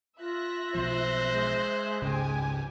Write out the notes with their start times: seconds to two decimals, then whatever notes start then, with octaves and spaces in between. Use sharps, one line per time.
0.20 F4 E5 F#6 A#6
0.75 B1 B2 F3 C5
1.32 G#3
2.02 G#1 C#2 C#3 G4 G#5